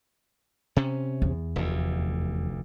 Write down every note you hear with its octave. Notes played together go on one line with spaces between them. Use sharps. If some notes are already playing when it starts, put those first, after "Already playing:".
C3 C#4
E2
F1 D2